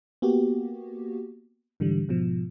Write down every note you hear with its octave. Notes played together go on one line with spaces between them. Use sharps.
A#3 B3 F#4 G4
G#2 D3 E3 G3
G#2 B2 F3